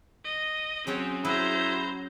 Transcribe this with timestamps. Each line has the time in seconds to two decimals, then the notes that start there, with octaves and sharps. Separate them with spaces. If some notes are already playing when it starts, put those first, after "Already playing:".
0.24 D#5
0.87 F#3 C4 C#4 G#4 C#5
1.25 F#3 E4 C5 A#5